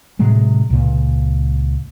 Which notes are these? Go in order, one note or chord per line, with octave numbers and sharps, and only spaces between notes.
A2 C3 F#3 G#3
C#2 A#2